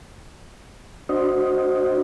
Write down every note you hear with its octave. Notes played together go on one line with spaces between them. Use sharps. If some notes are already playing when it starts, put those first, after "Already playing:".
D4 F#4 C5 D#5